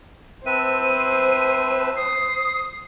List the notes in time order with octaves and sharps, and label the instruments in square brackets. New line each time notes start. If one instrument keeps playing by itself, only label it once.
[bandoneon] C4 B4 E5 [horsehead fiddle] C5 [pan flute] A5 [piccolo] D#7
[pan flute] D#6 [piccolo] C7